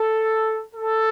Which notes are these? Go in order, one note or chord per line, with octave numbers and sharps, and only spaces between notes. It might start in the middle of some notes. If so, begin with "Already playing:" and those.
Already playing: A4
A4